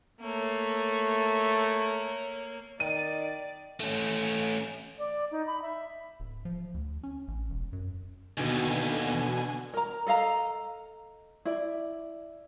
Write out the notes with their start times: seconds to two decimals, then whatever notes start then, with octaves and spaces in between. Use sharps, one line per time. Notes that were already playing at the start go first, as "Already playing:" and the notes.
0.21 A3 A#3 C#5
2.80 D#3 D5 D#7
3.80 A3 C#4
4.98 D5
5.31 D#4
5.47 B5
5.62 E5
6.20 D1
6.45 F3
6.74 D2
7.03 C#4
7.28 A1
7.50 E1
7.73 F#2
8.38 D#2 B2 D3 G#5
9.74 A#4 A#5
10.06 A4 D#5 F5 A#5
11.45 E4 D5